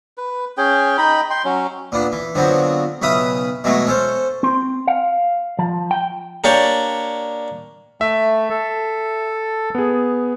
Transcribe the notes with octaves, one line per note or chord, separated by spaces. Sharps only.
B4
C#4 G#4 G5
D#4 D#5 G5 B5
G5 C6
F#3 C#4
A#2 B3 D4
E3
D3 F3 F#3 B3 C4
B1 C#3 B4 E5 B5 D#6
B2 E3 F#3 G#3 A3
C#4 A4 C5
C4
F5
F3
G5
A#3 D4 G4 C#5 D5
A3 E5
A4
B3 G#4